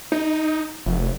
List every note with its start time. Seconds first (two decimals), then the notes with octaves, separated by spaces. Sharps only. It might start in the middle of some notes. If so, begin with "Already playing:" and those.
0.12 D#4
0.86 F1